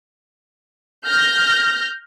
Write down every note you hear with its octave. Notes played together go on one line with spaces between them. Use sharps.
F6 G6 A#6